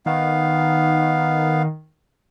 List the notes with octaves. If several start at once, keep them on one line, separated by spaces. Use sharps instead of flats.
D#3 B3 F5